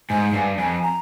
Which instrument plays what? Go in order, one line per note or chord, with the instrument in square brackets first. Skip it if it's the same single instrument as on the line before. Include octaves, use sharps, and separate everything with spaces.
[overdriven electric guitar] G#2 [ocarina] G#5
[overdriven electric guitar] G2
[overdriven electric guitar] F2 [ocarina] G#5
[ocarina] A#5